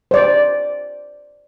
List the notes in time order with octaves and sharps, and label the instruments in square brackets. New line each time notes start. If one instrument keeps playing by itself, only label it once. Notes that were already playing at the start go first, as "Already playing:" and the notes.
[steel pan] C5 D5